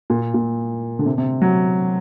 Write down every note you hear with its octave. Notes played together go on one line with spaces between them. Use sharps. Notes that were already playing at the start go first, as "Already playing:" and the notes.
A#2
A#2
D3
C3
C3
F#3